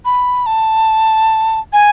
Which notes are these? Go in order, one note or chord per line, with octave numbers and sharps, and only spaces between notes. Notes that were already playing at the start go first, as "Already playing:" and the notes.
B5
A5
G#5